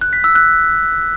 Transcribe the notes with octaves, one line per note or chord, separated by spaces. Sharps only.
F#6
B6
E6
F#6